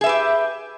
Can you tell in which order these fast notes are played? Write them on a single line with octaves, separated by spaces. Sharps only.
G#4 E5 B4 G4